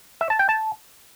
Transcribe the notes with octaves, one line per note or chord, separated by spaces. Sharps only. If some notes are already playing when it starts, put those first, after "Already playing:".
E5
A5
G5
A5